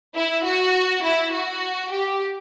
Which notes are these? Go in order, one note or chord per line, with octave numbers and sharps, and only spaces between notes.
E4
F#4
E4
F#4
G4